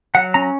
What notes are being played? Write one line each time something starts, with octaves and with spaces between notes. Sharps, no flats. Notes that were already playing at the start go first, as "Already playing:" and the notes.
F#3 F#5
C#4 A#5